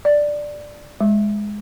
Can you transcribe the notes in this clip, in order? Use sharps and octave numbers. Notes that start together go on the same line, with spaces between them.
D5
G#3